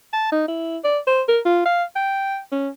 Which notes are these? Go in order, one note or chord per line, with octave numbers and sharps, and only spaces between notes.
A5
D#4
E4
D5
C5
A#4
F4
F5
G5
C#4